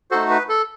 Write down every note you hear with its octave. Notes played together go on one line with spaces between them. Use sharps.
A3 D#4 F#4 A4 C5
B4
A4